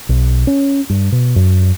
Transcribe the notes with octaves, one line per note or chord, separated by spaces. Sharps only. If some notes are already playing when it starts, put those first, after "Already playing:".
B1
C#4
G2
B2
F#2